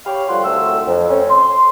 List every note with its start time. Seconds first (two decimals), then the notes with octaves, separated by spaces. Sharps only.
0.05 G4 C#5 F5 B5
0.28 D3 F3 G3 F4 F#5 C6
0.44 C2 D3 F#3 A3 C4 E6
0.86 F2
1.09 A3 C4 C#4
1.29 C6